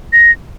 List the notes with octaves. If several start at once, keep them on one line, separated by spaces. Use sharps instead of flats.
A#6